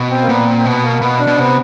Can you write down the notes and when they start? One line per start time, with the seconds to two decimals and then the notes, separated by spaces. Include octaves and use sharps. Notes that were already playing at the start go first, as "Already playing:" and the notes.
Already playing: B2
0.10 C4
0.22 A#3
0.28 A#2 B3
0.46 C4
0.57 C4
0.65 B2 B3
0.83 A#3
1.02 B2 B3
1.20 D4
1.27 B2
1.37 C3 B3